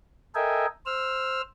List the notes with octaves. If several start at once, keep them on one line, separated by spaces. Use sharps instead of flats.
A4 A#4 D#5 E5 G5 G#5
C5 E6 F6